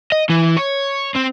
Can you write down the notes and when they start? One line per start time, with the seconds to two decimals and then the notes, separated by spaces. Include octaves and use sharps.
0.12 D#5
0.30 E3
0.57 C#5
1.15 C4